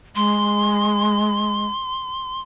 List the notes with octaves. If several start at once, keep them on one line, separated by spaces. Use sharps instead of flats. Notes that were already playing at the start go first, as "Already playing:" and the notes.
G#3 C6